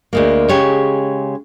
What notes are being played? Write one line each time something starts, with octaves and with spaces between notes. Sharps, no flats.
D2 G#3 A#3
C#3 G#3 G4 C#5